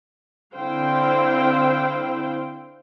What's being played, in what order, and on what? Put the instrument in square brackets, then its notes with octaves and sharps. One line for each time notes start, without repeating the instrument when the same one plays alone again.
[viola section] D3 C4 E4 C5 F5 G5